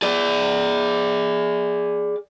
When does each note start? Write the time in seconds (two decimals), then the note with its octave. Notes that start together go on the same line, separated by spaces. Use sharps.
0.02 G#4 D5